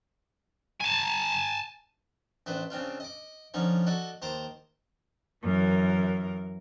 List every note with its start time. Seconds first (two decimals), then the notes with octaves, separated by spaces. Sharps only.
0.81 G#5 A5
2.46 A1 D4 B4 C5
2.70 C#3 C4 D4 F4
3.00 D#5 D6
3.54 D3 F3 C#4 D#4
3.87 F#4 A4 D5 D#5
4.22 D#2 C5 A5 A#5 D6
5.43 F#2 E3 A#4